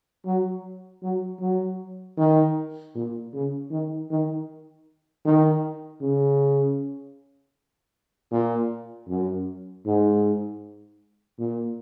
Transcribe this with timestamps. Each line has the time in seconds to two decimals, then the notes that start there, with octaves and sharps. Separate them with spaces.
0.25 F#3
1.03 F#3
1.40 F#3
2.17 D#3
2.95 A#2
3.33 C#3
3.71 D#3
4.10 D#3
5.25 D#3
6.02 C#3
8.31 A#2
9.09 F#2
9.86 G#2
11.39 A#2